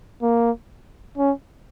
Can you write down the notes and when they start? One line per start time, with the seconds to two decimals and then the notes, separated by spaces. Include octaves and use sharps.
0.22 A#3
1.17 C#4